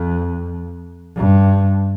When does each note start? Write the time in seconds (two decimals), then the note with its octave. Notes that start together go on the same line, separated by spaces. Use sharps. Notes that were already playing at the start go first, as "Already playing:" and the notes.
Already playing: F2
1.16 G2